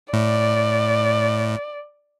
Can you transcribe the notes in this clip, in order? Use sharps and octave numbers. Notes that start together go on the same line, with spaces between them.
A2 D5